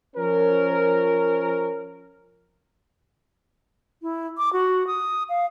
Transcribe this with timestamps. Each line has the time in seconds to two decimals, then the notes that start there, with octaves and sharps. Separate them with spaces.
0.16 F3 C#4 A#4
4.02 E4
4.38 D6
4.53 F#4
4.87 D#6
5.29 F5